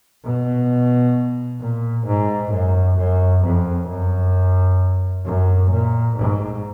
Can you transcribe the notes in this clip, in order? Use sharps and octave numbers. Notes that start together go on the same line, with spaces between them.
B2
A#2
G#2
F#2
F#2
F2
F#2
F#2
A#2
G#2